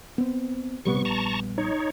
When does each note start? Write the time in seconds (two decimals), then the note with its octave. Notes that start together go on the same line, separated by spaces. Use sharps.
0.18 B3 C4
0.85 A#1 C3 G3 B3 C#6
1.05 A5 A#5 C#6
1.58 D#4 C#5